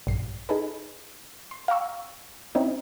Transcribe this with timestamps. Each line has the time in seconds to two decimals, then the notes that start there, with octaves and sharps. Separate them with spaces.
0.07 A#1 G2 C7
0.49 D#4 G#4 A4 B4
1.51 C6
1.68 F5 G5 A#5 C#6 E6
2.55 C4 C#4 D#4 E4